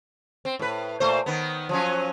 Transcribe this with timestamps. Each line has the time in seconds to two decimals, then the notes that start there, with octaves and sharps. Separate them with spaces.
0.45 C4
0.59 A2 B4
1.00 A#2 A3 C5
1.26 D#3 B3
1.69 F3 F#3 C#4